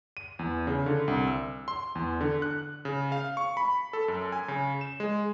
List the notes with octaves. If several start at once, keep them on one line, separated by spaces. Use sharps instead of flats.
D#7
E2
C#3
D3
C2
E6
C6
E2
D3
F#6
C#3
F5
C#6
B5
A4
F#2
G#5
C#3
E7
G#3